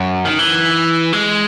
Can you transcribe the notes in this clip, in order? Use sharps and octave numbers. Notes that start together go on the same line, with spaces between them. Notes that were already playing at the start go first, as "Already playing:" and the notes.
Already playing: F#2
D#3
E3
G#3